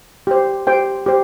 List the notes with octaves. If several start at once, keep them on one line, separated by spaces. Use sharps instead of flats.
G4 C5
G4 C5 G5
G4 C5